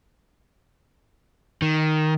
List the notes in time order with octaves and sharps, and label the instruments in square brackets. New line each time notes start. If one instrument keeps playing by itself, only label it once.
[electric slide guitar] D#3